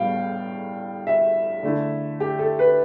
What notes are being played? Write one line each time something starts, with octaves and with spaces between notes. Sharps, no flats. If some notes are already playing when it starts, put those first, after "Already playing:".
Already playing: A2 G3 B3 F5 G5
E5
D3 A3 E4
G4
A4
B4